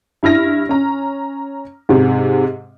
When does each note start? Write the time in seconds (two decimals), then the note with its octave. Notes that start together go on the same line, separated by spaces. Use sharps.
0.23 G2 E4 F6 A#6
0.69 C#4 A#5
1.89 G#2 C3